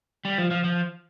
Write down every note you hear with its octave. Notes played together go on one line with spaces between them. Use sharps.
G3
F3
F3
F3